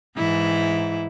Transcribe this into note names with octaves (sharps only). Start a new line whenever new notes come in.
G#2 E3 E4